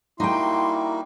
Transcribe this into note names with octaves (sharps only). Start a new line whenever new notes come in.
G3 A#3 D#4 E4 F#4 G5 C6